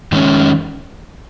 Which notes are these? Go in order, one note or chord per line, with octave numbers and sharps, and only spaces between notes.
D#3 G#3 C#4